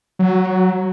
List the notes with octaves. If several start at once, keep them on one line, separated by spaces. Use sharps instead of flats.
F#3